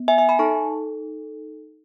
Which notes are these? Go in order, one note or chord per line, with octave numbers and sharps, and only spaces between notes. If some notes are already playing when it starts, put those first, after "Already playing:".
Already playing: B3
E5 G#5
E5 G#5
G#5 B5
D#4 A4 A5 C#6